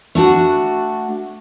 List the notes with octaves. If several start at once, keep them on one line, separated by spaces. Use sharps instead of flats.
A3 D4 F#4 F#5